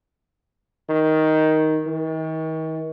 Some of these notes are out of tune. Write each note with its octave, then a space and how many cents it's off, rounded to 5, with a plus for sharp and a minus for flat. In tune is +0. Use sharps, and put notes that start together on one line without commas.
D#3 +10
D#3 +40